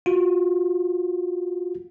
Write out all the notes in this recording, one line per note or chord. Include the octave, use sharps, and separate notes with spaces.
F4 F#4